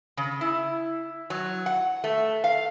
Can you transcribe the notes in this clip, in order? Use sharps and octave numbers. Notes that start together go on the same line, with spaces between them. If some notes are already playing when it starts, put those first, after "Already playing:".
C#3
E4
F#3
F#5
A3
F5